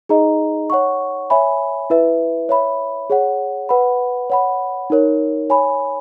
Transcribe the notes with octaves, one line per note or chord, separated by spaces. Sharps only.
D#4 G#4 D#5 A#5
C#5 F#5 C#6
C#5 E5 G#5 B5
E4 B4 E5
C#5 E5 B5
G#4 C#5 F#5
B4 F#5 B5
C#5 F#5 B5
D#4 A#4 C#5
C#5 G#5 B5